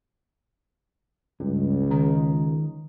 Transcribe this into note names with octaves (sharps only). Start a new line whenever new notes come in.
C#2 G2
D#3 A#5